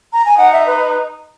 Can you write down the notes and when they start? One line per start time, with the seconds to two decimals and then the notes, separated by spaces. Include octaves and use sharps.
0.13 A#5
0.25 G#5
0.37 D#4 F#5
0.53 E5
0.67 B4